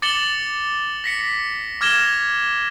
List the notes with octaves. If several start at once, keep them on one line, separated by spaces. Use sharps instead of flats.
D6 A6 C#7 E7 F#7 G7
A#6 B6 C#7
D6 F6 G#6 A#6 E7 G7